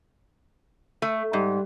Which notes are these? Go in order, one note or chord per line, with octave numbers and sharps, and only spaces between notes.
A3
G#2 G3